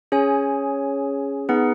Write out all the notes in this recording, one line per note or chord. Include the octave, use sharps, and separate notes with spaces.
C#4 G#4 C#5 G#5
B3 D#4 G#4 B4 F#5